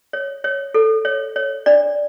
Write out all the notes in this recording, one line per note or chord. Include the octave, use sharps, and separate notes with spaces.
C#5
C#5
A4
C#5
C#5
D4 D5